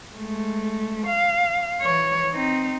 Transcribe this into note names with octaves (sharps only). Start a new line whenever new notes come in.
G#3 A3
F5
E3 C#5
C4 D#4